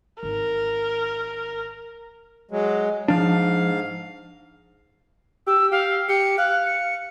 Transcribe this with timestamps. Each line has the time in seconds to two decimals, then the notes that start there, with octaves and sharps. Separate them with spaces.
0.23 G#1 A#4
2.51 F#3 G#3
3.08 G#2 F3 D4 F5
5.47 G4 E6
5.72 G4 F5
6.09 G4 C#7
6.38 F5 F#6
6.66 C#7